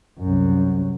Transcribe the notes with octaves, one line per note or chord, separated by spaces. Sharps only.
C2 F#2